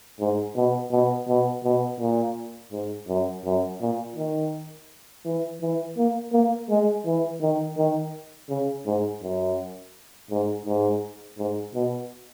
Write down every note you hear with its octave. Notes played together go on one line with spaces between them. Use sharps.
G#2
B2
B2
B2
B2
A#2
G#2
F#2
F#2
A#2
D#3
E3
E3
A#3
A#3
G#3
E3
D#3
D#3
C#3
G#2
F#2
G#2
G#2
G#2
B2